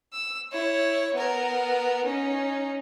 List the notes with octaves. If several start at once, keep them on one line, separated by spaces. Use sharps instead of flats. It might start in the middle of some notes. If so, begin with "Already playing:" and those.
E6
E4 C#5
B3 A#4
C#4 D#4